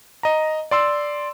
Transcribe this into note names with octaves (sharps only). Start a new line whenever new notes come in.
D#5 A#5
D5 C6 E6